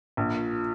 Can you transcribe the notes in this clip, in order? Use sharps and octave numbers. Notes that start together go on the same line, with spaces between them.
A#1